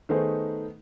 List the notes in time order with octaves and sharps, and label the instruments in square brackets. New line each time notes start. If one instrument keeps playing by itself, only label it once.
[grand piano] D#3 A3 B3 D#4 G#4 C5